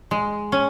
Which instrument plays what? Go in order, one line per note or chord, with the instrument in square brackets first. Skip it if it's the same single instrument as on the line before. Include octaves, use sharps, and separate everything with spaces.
[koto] G#3
C#4